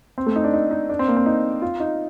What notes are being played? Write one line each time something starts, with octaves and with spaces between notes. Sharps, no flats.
C4
A3
D#4
D4
D#4
D#4
D4
C4
A#3
C4
D#4
F4
D#4